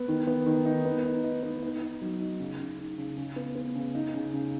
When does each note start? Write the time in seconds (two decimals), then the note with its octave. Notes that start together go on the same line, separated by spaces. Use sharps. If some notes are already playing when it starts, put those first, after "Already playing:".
Already playing: B3
0.08 D#3
0.27 B3
0.46 D#3
0.65 D#4
0.85 B3
1.04 D#4
1.24 D#4
1.43 B3
1.62 D#4
1.81 D#4
2.01 F#3
2.20 D#4
2.40 C#3
2.59 C#3
2.79 D#4
2.98 C#3
3.17 C#3
3.36 B3
3.55 B3
3.75 C#3
3.95 D#4
4.14 C#3
4.33 C#3